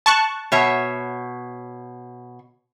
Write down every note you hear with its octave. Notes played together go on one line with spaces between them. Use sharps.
A5 C#6 F#6
B2 C#5 E5